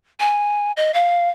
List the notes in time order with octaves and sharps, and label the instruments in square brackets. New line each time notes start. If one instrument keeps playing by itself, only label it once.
[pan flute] G#5
D#5
F5